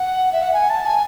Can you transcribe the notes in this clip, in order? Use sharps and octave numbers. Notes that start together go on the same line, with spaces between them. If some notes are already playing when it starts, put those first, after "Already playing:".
Already playing: F#5
E5
F#5
G#5
A5
G#5